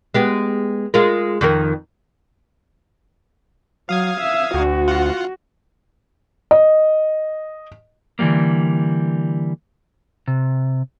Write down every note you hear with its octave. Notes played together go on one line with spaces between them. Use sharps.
G#3 B3 G4
G#3 F4 A#4
F2 D#3 A#4
F#3 F5 D#6 G#6
E5
D2 F#4
F4 F#5
D#5
D3 E3 F#3 G3 A#3
C3